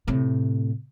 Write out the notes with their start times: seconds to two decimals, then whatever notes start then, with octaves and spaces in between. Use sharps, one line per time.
0.08 A2 C3